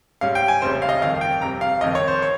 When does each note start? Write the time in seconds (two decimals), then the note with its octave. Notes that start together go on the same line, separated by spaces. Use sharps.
0.21 G#2 G3 C#4 F5
0.35 G5
0.48 G#5
0.62 F1 F2 C#3 G3 C#4 C5
0.82 F5
0.89 D#5
1.01 G1 F2 D#3 F5
1.21 G5
1.42 G1 F2 C3 A#5
1.61 F5
1.81 G1 F2 D#3 D#5
1.95 C#5
2.08 C5
2.22 C#5